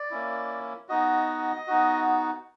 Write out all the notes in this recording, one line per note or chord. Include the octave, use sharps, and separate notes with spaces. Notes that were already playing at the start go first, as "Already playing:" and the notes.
Already playing: D5
A#3 C#4 E4
B3 D#4 F#4 D#5
B3 D#4 F#4